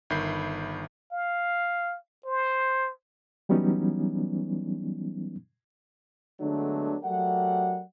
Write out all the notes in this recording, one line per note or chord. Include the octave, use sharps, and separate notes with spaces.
G1 D#3 E5 B5 G6 C7
F5
C5
E3 F#3 G3 B3 C#4 D#4
D3 F#3 G#3 A3 B3 D4
F#3 A3 G4 A#4 D5 F#5